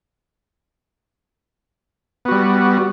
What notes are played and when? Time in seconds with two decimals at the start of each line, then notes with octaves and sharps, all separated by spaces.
2.25 B3
2.28 F#4
2.31 G3